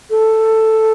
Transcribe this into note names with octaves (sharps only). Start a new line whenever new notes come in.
A4